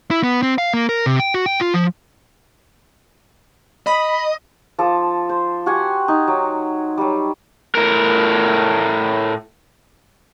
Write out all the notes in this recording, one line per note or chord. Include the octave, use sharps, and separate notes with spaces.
E4
B3
C4
F5
A#3
A#4
C3
G5
F#4
G5
F4
F3
D#5 B5
F3 A4 D6
C5
F#4 G4 F#5 G#5
D#4
F#3
F#3 G3
A2 A#4